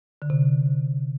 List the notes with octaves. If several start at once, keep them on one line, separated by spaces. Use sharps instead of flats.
D3
C3